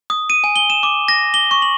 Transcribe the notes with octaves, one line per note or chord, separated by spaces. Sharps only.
D#6
D#7
G#5
G7
E7
D6
A#6
G7
C#6
F#7